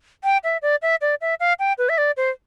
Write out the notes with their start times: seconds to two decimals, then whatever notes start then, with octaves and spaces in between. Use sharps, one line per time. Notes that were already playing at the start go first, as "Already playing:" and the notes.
0.24 G5
0.44 E5
0.62 D5
0.82 E5
1.01 D5
1.21 E5
1.40 F5
1.59 G5
1.78 B4
1.89 E5
1.98 D5
2.17 C5